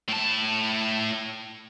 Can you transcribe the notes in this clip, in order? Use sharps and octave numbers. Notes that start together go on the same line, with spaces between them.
A2 A5